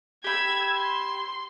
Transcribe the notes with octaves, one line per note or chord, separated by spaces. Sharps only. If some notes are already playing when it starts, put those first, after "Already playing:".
G4 B5 E6 G#6
C6